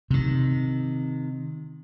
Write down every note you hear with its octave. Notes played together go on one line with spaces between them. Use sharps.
C3 D#3